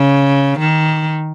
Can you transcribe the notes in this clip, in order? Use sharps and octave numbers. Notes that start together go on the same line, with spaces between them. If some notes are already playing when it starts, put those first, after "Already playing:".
Already playing: C#3
D#3